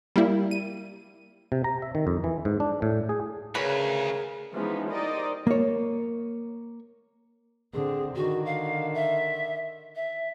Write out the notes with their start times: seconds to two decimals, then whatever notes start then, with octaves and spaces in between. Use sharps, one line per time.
0.16 G3 A#3 E4
0.51 D#7
1.52 C3
1.64 A#5
1.82 E5
1.95 D#3
2.07 F2
2.24 E3
2.45 G#2
2.60 D4
2.82 A2
3.09 G#4
3.55 D2 C#3 G#4 A#4 B4 C#5
4.54 E3 F3 G#3 B3 C#4 D#4
4.90 D#4 G4 A#4 C5 D5 D#5
5.47 A#3 C#5
7.73 D3 C4 G#4
8.16 D3 D#3 F#4
8.45 F5
8.95 E5
9.96 E5